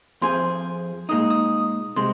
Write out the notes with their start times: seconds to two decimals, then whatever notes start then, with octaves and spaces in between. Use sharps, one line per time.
0.22 F2 F3 C4 G#4 C6
1.09 A#2 G#3 D#4 D#6
1.30 D#6
1.96 C3 G#3 C6